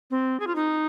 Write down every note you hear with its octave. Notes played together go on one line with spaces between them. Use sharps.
C4
G#4
F4
D#4